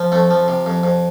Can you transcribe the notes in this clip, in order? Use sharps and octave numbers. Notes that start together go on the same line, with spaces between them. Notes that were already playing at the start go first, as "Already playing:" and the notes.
Already playing: F3
F2 A3
F3
C3
F2
F2